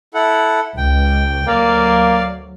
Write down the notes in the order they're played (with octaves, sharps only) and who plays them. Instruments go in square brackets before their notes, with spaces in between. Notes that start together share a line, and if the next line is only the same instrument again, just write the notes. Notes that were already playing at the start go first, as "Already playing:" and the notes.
[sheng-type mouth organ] E4 A4 F#5
[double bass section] C#2 [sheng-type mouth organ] G5
[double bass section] D2 F#3 [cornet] A#3 [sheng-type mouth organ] D5 F5